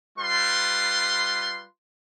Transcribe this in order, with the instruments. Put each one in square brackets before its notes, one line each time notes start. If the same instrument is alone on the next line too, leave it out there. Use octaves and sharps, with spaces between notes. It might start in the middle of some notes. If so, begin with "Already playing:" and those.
[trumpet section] G3 F4 B4 C6